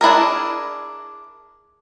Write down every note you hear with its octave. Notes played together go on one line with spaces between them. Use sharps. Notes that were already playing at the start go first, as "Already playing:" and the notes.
D4 E4 G#4 A#4